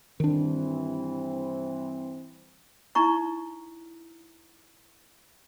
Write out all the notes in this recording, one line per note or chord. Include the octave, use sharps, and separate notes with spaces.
G2 D#3 E3 C4 D4
D#4 E4 A#5 C#6